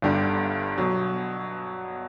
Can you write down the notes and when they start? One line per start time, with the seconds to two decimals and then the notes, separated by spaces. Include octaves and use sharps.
0.02 G1 G2 D3 G3
0.78 B2 F#3